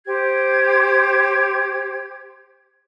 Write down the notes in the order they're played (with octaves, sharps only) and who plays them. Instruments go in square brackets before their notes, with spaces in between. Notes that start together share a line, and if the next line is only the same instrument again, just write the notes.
[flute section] G4 C5 G#6